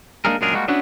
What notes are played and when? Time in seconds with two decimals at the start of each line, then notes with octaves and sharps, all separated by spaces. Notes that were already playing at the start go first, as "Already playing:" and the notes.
0.25 G#3 A#3 D4 D#4 G#4 A#4
0.41 F#2 A#2 G#3 D4 G#4 A#4
0.53 G3 G#3 A#3 F#4
0.68 B3 C#4 D4 E4 F#4 B4